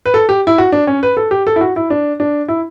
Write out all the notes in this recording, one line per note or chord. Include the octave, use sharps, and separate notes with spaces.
B4
A4
G4
E4
F#4
D4
C#4
B4
A4
G4
A4
E4
F#4
E4
D4
D4
E4